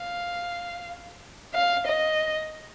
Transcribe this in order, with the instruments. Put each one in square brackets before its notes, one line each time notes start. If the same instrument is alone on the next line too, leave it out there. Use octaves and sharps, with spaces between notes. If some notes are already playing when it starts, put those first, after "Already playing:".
Already playing: [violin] F5
F5
D#5